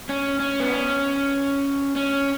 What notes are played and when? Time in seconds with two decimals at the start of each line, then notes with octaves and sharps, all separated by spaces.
0.09 C#4
0.40 C#4
0.60 B3
0.72 C#4
1.96 C#4